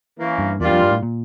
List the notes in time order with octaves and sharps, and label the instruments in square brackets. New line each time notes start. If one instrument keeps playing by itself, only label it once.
[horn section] E3 A#3 C#4
[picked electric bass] G2
[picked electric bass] E2 [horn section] A#2 G3 D4 F4
[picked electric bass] F2
G2
A2
A#2